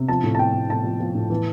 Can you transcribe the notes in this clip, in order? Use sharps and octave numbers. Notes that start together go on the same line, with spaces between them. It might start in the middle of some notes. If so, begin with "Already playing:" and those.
Already playing: C3
F3 A5
A2
A5
F3 G5
A2
A2 A5
F3
F3
A2
E3